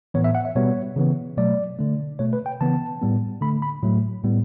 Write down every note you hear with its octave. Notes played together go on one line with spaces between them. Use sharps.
A2 E3 B3 C#5
E5
F#5
E5
B2 G3 B3 C#5
C#3 E3 B3
B2 F#3 A3 D5
D3 A3
B2 A3 C#5
B4
G5
C#3 E3 B3 A5
A2 G3 B3
D3 A3 B5
B5
A2 F#3 A3
A2 G3 B3